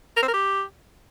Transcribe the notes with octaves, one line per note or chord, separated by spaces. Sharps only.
A#4
C4
A#4
G4